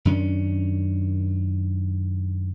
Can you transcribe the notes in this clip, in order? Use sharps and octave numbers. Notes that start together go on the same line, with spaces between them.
F#2 D#3 C#4 D4